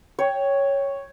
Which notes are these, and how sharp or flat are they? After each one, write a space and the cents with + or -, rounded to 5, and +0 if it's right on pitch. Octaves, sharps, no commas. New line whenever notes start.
C#5 +0 G5 +5